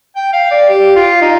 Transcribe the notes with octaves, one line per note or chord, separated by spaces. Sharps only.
G5
F5
D5
G4
F4
D#4